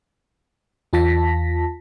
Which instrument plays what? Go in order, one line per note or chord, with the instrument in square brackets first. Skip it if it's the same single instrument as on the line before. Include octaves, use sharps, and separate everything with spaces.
[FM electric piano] E2 F4 A5 A#6 B6